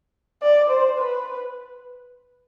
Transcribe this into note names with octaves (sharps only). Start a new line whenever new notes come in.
D5
C5
B4